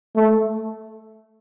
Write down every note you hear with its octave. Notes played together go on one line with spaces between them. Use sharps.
A3